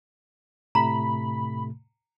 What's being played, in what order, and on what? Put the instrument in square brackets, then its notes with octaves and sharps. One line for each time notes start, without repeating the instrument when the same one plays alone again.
[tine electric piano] A2 C3 A3 [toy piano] A#5 [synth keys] B5